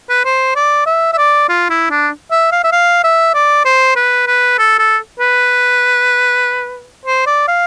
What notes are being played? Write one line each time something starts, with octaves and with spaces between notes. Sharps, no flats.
B4
C5
D5
E5
E5
D5
F4
E4
D4
E5
F5
E5
F5
E5
D5
C5
B4
B4
A4
A4
B4
C5
D5
F5